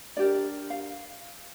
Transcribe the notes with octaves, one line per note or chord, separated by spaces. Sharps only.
D4 G4 A#4 D5
F5